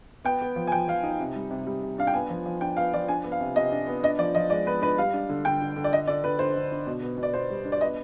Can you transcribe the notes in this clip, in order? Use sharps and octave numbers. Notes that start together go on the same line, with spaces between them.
B3 G5
B3
F3
G#5
F3 G5
F3 F5
D#4
C3
G3
C3
G3
C3
D4 F5
G5
B3 G#5
F3
F3
D4 G5
B3 F5
F3 D5
D4 G#5
B3
F5
C3
C3 D#5
D4
B3
D4 D#5
F3 D5
F3 D#5
G#3 D5
B3 B4
D4 B4
G3 F5
D4
D3
D3 G5
D3
D3
D5
D3 D#5
D3 D5
D3 B4
D3 C5
D3
D4
B2
B3
B2
D5
B3 C5
G3
D4
D5
B3 D#5